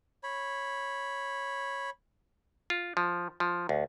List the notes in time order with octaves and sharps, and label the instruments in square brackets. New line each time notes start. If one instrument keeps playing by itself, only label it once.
[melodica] C#5 B5
[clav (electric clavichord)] F4
F3
F3
D2